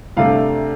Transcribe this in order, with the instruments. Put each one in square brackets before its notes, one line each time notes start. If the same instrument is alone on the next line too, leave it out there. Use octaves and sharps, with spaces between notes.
[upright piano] C2 C3 A3 D4 F5